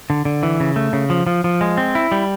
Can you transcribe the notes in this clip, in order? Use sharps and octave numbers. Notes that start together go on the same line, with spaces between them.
D3
D3
E3
C#3
A3
C#3
F3
F3
F3
G#3
C4
E4
G3